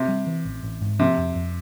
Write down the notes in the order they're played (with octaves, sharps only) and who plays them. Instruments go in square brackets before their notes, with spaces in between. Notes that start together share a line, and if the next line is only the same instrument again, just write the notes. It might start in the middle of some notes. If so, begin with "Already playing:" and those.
Already playing: [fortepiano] C3
[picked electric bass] G3
E3
A1
A1
G#2
[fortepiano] C3 [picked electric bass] F3
[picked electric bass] F2
F2